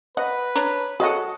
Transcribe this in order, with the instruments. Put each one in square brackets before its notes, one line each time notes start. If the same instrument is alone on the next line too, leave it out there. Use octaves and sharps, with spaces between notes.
[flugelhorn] B4 [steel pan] D#5 [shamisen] F#5
[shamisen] D4 C#5 A#5
[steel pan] F#4 D#5 F#5 [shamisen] G#4 A4